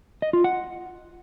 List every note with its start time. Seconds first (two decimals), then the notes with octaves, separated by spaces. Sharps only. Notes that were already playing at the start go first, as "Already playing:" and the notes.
0.22 D#5
0.33 F4
0.44 F#5